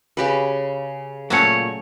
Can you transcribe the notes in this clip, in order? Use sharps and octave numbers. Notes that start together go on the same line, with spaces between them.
C#3 G4 B4
A#2 F#3 A3 C#4 C#5